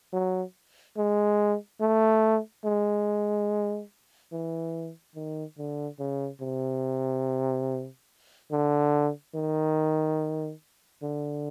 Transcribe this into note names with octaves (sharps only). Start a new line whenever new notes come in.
F#3
G#3
A3
G#3
E3
D#3
D3
C#3
C3
D3
D#3
D3